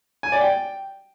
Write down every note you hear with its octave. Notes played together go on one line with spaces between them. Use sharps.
G#5
D5
G5